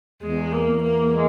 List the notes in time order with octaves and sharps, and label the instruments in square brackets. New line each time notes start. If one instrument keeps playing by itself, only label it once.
[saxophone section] E2 [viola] G#3
[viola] A#3
[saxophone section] E2
[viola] A#3
[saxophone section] G#3